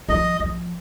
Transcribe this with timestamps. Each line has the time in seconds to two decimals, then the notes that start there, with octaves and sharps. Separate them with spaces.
0.09 F3 D#5
0.40 F3